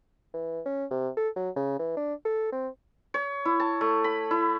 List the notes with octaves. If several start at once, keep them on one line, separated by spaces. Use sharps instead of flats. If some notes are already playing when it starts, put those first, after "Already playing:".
E3
C#4
C3
A4
F#3
C#3
E3
D4
A4
C4
C#5
E4
A5
A3
B5
E4